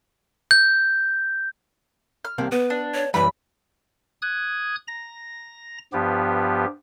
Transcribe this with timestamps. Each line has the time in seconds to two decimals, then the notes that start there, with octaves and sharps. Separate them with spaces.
0.51 G6
2.25 F6
2.38 C2 C3 A#3
2.52 B3 B4
2.70 D4
2.94 C#5
3.14 F#2 E3 G3 B4 B5
4.22 D#6 F#6 G#6
4.88 A#5 A#6
5.93 G2 F3 B3 G4